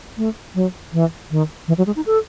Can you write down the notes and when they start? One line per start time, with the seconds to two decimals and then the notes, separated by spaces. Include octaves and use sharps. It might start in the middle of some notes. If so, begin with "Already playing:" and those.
0.17 A3
0.55 F#3
0.93 E3
1.31 D#3
1.68 E3
1.78 F#3
1.87 G#3
1.96 D#4
2.06 A4